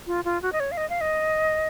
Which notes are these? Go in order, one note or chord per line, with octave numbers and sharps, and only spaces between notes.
F4
F4
F#4
D#5
C#5
F5
D#5
F5
D#5